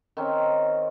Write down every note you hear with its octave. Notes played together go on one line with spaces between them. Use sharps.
D#3 C4 C#4 F5